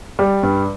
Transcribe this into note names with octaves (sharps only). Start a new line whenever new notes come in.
G3
G2